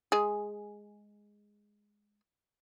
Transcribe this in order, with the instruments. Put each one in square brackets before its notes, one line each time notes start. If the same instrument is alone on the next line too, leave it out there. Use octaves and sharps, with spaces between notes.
[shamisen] G#3 G#4